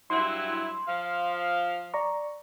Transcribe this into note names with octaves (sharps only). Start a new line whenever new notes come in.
G2 F#3 E4 C6
F3 F5
D5 A#5 C#6